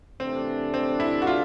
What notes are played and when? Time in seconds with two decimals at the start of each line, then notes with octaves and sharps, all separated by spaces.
0.20 C3 E3 A3 C4 D4
0.74 C4
1.00 E4
1.22 F#4
1.27 F4